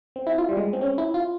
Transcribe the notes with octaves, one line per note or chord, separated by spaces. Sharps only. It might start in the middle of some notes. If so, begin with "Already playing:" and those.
C4
E4
F4
G3
G#3
C4
C#4
E4
F4